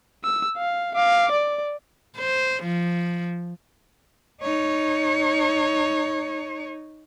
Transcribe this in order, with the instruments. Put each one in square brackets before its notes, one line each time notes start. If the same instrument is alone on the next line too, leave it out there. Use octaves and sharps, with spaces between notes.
[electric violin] E6
F5
F5 D6
D5
[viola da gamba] C5
F3
[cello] D#4 C#5